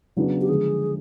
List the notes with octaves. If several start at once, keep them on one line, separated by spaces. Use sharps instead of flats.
C#3 F#3 B3 D4 E4
G4
D3 F3 G#3 G#4